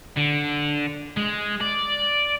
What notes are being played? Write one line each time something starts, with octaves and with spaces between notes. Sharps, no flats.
D3
G#3
D5